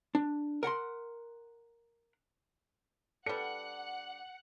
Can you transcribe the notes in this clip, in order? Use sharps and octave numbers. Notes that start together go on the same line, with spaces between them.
D4
A#4 F#5 A#5 C6
G3 D4 A4 B4 F#5 C#7